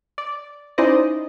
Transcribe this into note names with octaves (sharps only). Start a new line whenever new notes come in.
D5
C#4 D#4 E4 C5 D5 D#5